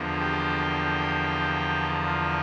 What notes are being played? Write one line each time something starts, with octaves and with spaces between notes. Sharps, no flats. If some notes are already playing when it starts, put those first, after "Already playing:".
Already playing: E2 D3 F3 A#3
G4
F4